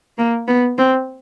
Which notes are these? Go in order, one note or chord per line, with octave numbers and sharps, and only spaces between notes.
A#3
B3
C4